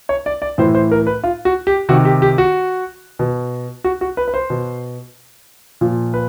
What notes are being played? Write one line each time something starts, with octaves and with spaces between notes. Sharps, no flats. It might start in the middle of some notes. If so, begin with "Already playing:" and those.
C#5
D5
D5
A2 E3 C5
C5
A#4
B4
F4
F#4
G4
C3 D#3 F#4
G4
G4
F#4
B2
F#4
F#4
B4
B4
C5
B2
A#2 F3
B4